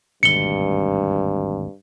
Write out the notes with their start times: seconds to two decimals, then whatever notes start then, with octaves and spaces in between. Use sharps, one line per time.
0.23 G#1 D2 G2 B2 C#7 G7